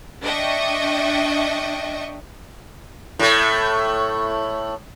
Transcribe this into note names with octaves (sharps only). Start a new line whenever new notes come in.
D4 D#5 E5 G5 C#6
A2 A3